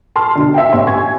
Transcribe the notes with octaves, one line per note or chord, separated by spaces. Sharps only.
A5 C6 F6
B1 D3
E5 F5 G5
A1 C#5 C6
G#5 C#6 G#6